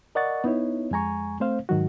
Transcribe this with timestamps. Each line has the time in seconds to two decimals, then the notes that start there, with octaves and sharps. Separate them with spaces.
0.15 A#4 D5 D#5 F#5 C#6 A6
0.44 B3 D#4 E4 C#5
0.91 F2 G#3 G#5 A#5 C#6
1.40 A3 C4 C5 F5
1.69 G#2 D#3 F#3 F#4